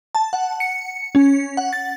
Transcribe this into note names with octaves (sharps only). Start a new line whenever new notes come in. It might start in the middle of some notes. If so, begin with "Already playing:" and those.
A5
F#5
C#7
C#4
F#5
A6